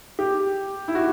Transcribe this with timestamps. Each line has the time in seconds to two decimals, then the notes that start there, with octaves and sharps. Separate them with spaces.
0.19 G4
0.88 E4
0.95 F#4